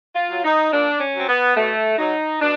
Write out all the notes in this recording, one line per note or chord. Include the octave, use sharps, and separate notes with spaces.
F4
F#3
D#4
A#2 D4
C#4
F#3 C4
B3
B2 A3
F#3 D#4
B2 D4